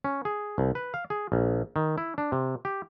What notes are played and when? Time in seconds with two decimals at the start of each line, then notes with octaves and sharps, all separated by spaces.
0.04 C#4
0.25 G#4
0.58 C2
0.75 B4
0.94 F5
1.10 G#4
1.32 A#1
1.76 D#3
1.98 E4
2.18 D4
2.32 C3
2.65 G4